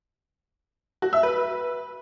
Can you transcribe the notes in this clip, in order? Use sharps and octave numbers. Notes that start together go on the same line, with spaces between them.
F#4
E5
B4